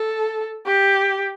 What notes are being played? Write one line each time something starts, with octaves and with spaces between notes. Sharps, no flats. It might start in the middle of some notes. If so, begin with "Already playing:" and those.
Already playing: A4
G4